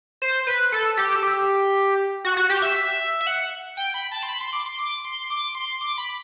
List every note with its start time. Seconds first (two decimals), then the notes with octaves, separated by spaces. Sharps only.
0.22 C5
0.47 B4
0.72 A4
0.97 G4
1.16 A4
1.23 G4
2.25 F#4
2.37 F#4
2.50 G4
2.62 E5
3.21 E5
3.27 F#5
3.77 G5
3.94 B5
4.12 A5
4.23 C6
4.29 B5
4.41 C6
4.53 D6
4.66 C6
4.79 D6
5.04 C6
5.30 D6
5.55 C6
5.81 D6
5.98 B5